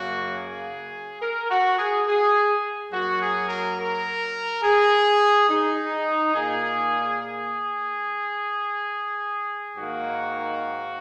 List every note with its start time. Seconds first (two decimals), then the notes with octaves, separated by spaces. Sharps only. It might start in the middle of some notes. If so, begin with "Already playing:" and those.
Already playing: F#2 C#3 A#3 F#4
0.36 G#4
1.21 A#4
1.50 F#4
1.78 G#4
2.07 G#4
2.92 F#2 F#3 A#3 F#4
3.20 G#4
3.49 A#4
3.78 A#4
4.63 G#4
5.49 D#4
6.34 A#2 A#3 G#4
7.20 G#4
9.76 G#2 D#3 A#3 F#4